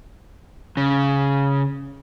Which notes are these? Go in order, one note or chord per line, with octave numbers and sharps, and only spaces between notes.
C#3